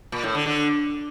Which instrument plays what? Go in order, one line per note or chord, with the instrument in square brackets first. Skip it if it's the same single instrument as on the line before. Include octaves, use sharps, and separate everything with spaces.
[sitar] A#2
A2
D3
D3